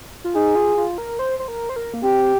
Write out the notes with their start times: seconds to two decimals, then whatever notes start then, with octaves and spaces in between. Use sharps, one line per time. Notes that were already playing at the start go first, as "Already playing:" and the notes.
0.24 F4
0.35 D#4 G#4
0.55 F4
0.77 F4
0.98 A#4
1.19 C5
1.39 C5
1.48 A#4
1.69 C5
1.76 A#4
1.94 A#3
2.03 C4 G4